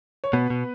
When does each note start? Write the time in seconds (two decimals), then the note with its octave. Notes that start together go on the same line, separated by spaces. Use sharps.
0.24 C#5
0.33 B2 B3 B4
0.50 B2